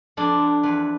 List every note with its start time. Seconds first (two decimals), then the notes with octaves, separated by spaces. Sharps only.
0.17 F2 D4
0.40 F2
0.63 E2 B4